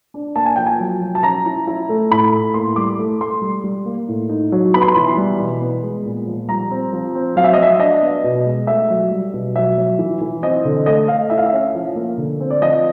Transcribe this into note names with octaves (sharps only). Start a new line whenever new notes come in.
D4
A#3 A5
G#5
F3 G5
G#5
F#3
F#3
A5
C#4 A#5
E4
E4
A3
A2 B5
A2
A#3 C6
G3 D6
A3
A3 C6
G3
G3
A#3
A2
D#4
F#3
B3 B5
C6
B5
E3
G3
B2
B3
G#3
A#2
F3
G3 A#5
C4
F3
C4
F#3 F5
E5
D#5
F#3 E5
D4 D#5
B3
B2
G#3
A3 E5
F#3
G3
B2
F#3 E5
F#3
E3
E3
C4 D#5
D3
A3 D#5
A3 F5
E4 E5
F5
E5
C#4
F3
A#3
D3
C4
D5
F3 D#5